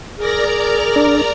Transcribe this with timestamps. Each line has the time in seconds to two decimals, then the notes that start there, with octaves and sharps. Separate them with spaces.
0.18 G#4 A#4 D5 A#5
0.96 D4